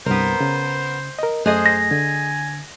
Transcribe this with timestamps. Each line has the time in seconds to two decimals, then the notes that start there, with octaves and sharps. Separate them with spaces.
0.06 C2 G2 B3 A#4 C5
0.40 C#3
1.19 A#4 D#5
1.46 F#2 A3 G#4 C5 D#5 F#6
1.66 A#6
1.91 D3 G#5